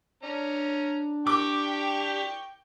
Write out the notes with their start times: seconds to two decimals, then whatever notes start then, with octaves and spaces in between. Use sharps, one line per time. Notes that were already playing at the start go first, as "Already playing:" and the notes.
0.23 C#4 D4 A#5
1.27 G4 G5 C#6 D6